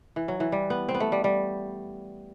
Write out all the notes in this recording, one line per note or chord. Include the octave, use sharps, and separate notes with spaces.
E3
F#3
E3
G3
B3
C4
B3
A3
G3
G3